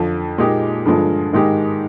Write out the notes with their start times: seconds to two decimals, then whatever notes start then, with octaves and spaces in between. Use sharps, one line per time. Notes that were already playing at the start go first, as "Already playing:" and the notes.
Already playing: F2 D3 F3
0.38 A#2 G#3 D#4 G4
0.85 G2 D3 F3 G#3
1.33 G#2 D#3 G#3 D#4 G4